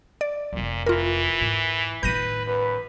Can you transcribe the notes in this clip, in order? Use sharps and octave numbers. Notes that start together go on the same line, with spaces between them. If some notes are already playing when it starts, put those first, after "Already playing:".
D5
F1 F2 A#2
E3 F4 A#4
G#2
A2 D#3 B4 G6 A#6 D#7
F#2 B4